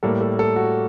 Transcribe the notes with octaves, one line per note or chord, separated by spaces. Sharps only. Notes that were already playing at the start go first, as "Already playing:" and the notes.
A2 G3 A#3 A4
A4
A4
F#4